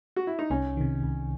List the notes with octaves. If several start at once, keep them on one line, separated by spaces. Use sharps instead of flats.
F#4
E4
D#4
C2 C#4
C3 D#3
C2